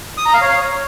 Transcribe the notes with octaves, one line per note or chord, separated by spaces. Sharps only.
D#6
A#5
F5
C#5